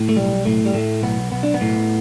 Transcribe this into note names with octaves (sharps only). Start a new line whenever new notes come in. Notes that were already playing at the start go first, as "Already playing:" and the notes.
Already playing: A2
A3
B1 G3
A2 A3
G3
A2 A3
B1 B3
B1 B3
D4
B3
A2